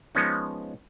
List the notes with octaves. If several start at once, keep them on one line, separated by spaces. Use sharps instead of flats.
F3 G#3 B3 C#4 D#4